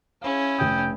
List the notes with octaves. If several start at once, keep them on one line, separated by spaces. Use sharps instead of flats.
C#4 E4 G#4 F5
F1 G5 D#6